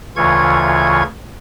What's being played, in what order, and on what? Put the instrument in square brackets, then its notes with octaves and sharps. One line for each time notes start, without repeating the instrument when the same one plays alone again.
[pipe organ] D2 C#3 E3 F4 C#6 G#6